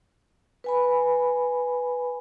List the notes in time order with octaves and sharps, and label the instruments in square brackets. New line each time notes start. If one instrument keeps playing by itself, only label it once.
[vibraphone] B4 G#5 B5